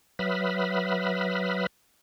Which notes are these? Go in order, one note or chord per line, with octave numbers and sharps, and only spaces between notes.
F#3 B4 E5 B5 D#6 F6